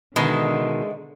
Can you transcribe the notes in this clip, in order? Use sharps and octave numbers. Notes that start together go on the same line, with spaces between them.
B2 D3 D#3 G#3 B4 D#5 E5